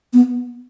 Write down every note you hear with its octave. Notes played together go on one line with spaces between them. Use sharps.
B3